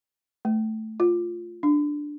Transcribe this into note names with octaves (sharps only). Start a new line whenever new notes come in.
A3
F4
D4